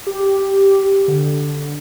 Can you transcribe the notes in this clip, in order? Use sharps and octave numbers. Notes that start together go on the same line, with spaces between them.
G4
D3